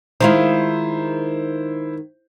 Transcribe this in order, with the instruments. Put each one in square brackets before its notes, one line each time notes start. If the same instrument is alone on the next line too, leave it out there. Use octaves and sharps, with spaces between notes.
[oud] D#3 G#3 F4 [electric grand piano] E4 C5